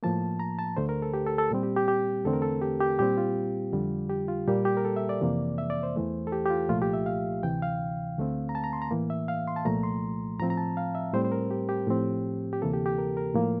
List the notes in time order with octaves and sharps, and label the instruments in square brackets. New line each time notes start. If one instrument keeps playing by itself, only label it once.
[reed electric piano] A2 F3 A#3 A5
A#5
A5
D2 D3 A3 C5
A#4
A4
G4
A4
A4
A#2 G3 C4
G4
G4
G4
E2 D3 A3 C4 A4
A#4
A4
G4
G4
A#2 G3 C4 G4
F4
F2 D3 G3
G4
F4
A#2 G3 A#3 G4
G4
A#4
A4
E5
D5
F2 C3 E3 A#3
E5
D5
C5
E2 E3 A3
A4
G4
G4
F4
C2 A#2 F3 A3 F4
G4
E5
F5
D2 C3 E3 G5
F5
D2 D3 A3 C4
A#5
A5
A#5
C6
A#5
A2 E3 A#3
E5
F5
C6
A5
C2 A#2 F3 A3 A#5
C6
A2 F3 C4 A#5
A#5
A5
F5
E5
A2 G3 C4 C5
C5
A#4
G4
G4
A2 F3 C4
G4
D2 C3 E3 A#3 A4
G4
G4
A#4
A#4
A2 F3 A#3